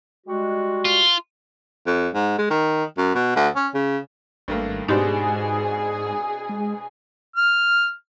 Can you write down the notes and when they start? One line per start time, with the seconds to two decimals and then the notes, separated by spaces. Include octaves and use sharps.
0.27 G3 G#3 F#4
0.85 F4
1.87 F2
2.14 G#2
2.38 G#3
2.50 D#3
2.98 F#2
3.15 B2
3.36 D2
3.56 C#4
3.74 C#3
4.48 G#1 G2 A3 A#3
4.88 G#2 B2 C4 D4 D#4 G4 G#4 C6
6.49 G#3
7.36 F6